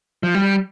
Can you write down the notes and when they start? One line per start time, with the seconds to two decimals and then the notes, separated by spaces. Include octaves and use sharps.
0.23 F3
0.34 G3